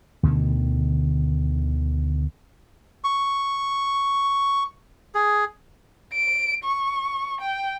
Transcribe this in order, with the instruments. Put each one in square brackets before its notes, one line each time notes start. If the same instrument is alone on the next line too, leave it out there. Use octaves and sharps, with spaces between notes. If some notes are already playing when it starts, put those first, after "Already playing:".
[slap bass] D2 B2 D3 D#3
[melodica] C#6
G#4
[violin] D7
C#6
G5